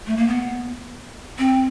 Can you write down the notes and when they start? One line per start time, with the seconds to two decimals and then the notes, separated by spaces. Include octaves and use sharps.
0.07 A3
0.17 A#3
0.28 B3
1.38 C4